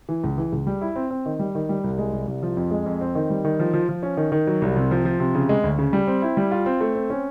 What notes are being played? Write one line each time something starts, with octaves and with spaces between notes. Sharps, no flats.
E3
C#2
E3
C#2
G3
E4
C4
C4
D#3
G3
D#3
G3
C2
G#3
C2
C2
F3
F2
G#3
F2
C4
D#3
G3
D#3
F3
F3
F3
C#4
D#3
D#3
F#3
C2
C3
F3
F3
C3
C#3
G#3
D2
C#3
G3
C4
E4
G3
F4
C4
A3
C4
C#4